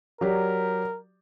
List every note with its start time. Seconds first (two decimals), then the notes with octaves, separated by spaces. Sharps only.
0.21 F#3 G4 A#4 D5